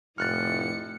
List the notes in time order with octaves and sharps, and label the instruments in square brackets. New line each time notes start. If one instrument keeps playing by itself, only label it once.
[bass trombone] F1 [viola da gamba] A2 E4 [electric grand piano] F6 F#6 A6 [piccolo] C#7